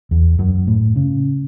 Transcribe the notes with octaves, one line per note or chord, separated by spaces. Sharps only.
E2
F#2
A2
C#3